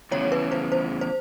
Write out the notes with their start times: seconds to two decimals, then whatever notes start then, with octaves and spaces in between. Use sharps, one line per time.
0.11 E2 C#3 F3 C#5
0.32 B4
0.52 C5
0.72 C5
1.01 C5